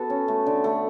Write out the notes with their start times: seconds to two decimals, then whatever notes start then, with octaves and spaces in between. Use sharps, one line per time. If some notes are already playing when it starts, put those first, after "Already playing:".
Already playing: B3 F#4 A4
0.10 C#4
0.28 A3
0.46 D3
0.64 A3